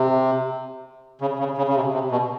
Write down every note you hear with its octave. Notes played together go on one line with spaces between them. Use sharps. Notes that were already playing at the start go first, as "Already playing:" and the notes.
Already playing: C3
C#3
C#3
C#3
C#3
C3
C3
B2